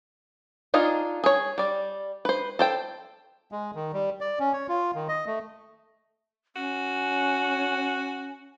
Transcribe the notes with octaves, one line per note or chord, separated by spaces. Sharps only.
D4 D#4 F4 G#4
G#4 C#5
G3 D5
B4 C5
A4 C5 G5
G#3
D#3
G3
D5
C#4
C#5
F4
D#3
D#5
A3
C#4 F#4